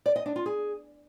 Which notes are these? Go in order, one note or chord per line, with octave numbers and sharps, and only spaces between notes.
D5
D#5
D4
F4
G#4